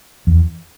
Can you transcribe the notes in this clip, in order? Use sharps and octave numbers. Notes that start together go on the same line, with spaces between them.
E2